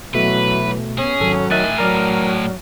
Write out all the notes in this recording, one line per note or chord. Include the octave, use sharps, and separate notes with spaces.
B2 E3 F#3 A3 B4
B3 C#4 G#4
G#1 F#3 A4
A2 D#3 E5 G#5 F#6 A6
F#3 A#4 D5 F6